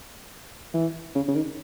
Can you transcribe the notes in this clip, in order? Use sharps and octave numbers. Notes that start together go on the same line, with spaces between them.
E3
C#3
C#3
D#3